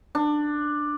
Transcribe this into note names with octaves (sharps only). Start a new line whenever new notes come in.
D4